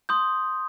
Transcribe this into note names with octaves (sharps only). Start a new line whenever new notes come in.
C6 D#6 G6